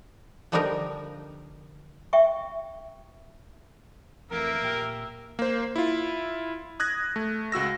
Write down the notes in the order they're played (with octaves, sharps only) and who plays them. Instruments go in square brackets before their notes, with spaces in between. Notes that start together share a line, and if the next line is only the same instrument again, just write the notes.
[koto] D3 F3 G3 D4 D#4 A#4
[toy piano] E5 G5 C#6
[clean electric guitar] F2 E3 A3 [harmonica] A#3 [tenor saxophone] A#4 [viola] E5
[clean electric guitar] A#2 G4
[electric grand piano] A#3 C5
E4 F4
D#6 F#6 G#6 A#6
A3
C#2 F#4 E6 A#6